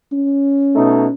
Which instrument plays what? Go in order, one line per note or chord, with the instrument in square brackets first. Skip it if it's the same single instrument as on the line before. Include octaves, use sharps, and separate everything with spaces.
[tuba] C#4
[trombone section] B2 A3 D#4